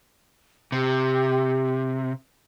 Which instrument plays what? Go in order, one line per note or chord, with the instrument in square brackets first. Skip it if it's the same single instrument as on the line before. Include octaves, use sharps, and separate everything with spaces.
[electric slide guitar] C3 [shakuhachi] G4